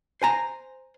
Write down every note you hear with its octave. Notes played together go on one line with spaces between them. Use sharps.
C5 G#5 A#5